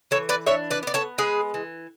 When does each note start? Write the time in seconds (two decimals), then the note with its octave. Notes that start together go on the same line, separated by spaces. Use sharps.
0.11 E3 A4 C#5
0.29 B4 D5
0.46 D4 C#5 E5
0.71 B4 D5
0.83 B3 D5
0.94 A4 C#5
1.18 G#3 G#4 B4
1.54 E3